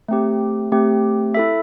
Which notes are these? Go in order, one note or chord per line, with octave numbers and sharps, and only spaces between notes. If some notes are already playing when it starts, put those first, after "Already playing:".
A3 C4 G4
A3 C4 G4
E4 A4 E5